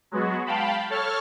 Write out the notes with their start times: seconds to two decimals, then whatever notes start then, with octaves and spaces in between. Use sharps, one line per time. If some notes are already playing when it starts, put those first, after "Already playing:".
0.11 F#3 G#3 B3 F#4
0.46 F5 G5 A5 B5
0.90 A4 C#5 A5 F6